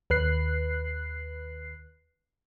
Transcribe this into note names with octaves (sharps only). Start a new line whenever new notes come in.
D#2 B4 F#6 C7